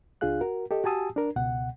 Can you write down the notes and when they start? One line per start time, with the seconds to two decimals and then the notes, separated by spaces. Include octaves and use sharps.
0.21 C#2 D4 F4 G#4 F5 F#6
0.41 F#4 A#4
0.71 G4 A4 D#5
0.84 F#4 G4 G#5 A5 D#6 E6
1.16 D4 A#4
1.36 C#2 B2 F#5